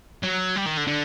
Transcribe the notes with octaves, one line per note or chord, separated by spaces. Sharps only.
F#3
G3
D#3
D3
D3